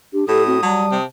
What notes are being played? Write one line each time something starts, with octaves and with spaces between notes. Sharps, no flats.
D4 G4
A2 G4 A4 D#6
C4 F#4
F#3 G3 A5
C3